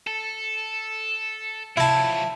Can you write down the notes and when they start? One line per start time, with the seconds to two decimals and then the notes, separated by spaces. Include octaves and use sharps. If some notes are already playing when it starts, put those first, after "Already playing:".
0.07 A4
1.77 F3 F#3 E4 A5